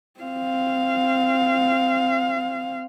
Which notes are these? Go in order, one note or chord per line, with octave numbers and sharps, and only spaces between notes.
C4 F5